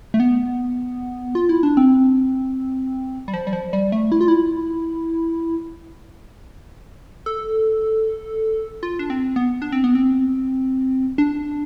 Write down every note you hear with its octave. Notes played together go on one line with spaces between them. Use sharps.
A3
B3
F4
E4
D4
C4
G3
F3
G3
F3
G3
A3
E4
F4
E4
A4
F4
D4
C4
B3
D4
C4
B3
C4
D4